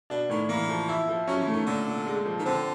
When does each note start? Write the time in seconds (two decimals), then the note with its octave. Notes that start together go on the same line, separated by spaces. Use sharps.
0.10 B2 D4
0.29 A2 D#3
0.49 E3 A#3
0.69 F3
0.89 E4
1.08 F3
1.28 F#3 C#4
1.41 E3
1.47 A3
1.53 D#3
1.66 A#2 D3
1.87 A#2
2.06 G#3
2.26 F3
2.39 D#3
2.45 D3 C4